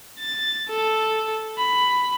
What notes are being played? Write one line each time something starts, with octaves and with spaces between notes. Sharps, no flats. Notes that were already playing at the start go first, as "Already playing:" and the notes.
A6
A4
B5